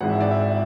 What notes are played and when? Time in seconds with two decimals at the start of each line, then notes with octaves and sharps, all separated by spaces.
0.01 G#1 G#2 E3 F#5
0.10 E5
0.20 D5
0.31 E5